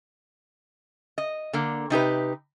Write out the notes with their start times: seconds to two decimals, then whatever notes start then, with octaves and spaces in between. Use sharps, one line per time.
1.18 D#5
1.53 D3 A#3
1.90 C3 D#4 G4 B4